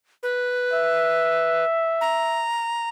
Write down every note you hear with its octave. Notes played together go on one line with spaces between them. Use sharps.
B4
E5
A#5